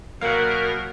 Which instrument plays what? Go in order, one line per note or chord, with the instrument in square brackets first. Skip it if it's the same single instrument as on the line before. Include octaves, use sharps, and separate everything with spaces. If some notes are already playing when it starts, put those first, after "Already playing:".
[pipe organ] B2 A#4 [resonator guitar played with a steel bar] F#3 A#3 [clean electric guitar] F5 F#5